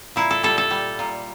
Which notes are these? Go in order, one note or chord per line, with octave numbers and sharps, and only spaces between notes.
A#2 E4
A4
G3 A4
A4
G3
A#2